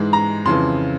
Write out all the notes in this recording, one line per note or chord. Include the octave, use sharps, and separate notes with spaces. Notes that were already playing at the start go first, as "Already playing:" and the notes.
Already playing: G#2 E3 G#3
A#5
F2 C#3 E3 C6